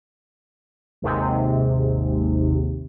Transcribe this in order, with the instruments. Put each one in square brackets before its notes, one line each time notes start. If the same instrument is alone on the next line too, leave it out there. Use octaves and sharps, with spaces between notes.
[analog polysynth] G#1 D#2 G#2 C3